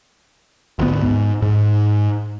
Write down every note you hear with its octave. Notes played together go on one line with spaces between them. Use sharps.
G#1 D2 D3 B3
G#2
G#2